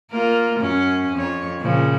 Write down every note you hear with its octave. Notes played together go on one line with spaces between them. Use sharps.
A#3 F4 A#4
F#2 C#4
F2 C#5
A#2 C#3 F3